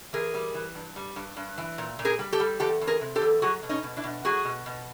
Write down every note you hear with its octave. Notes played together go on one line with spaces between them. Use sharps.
E3 G#4 A#4
G3
E3
G2
G3
G2
G2
E3
A#2
A#2
G#4 A#4
G3
G4 A4
G3
E2 G4 A4
E2
G#4 A#4
C3
G4 A4
E2
F#3 F#4 G#4
B2
C#4 D#4
B2
D4 E4
B2
F#3 F#4 G#4
B2
B2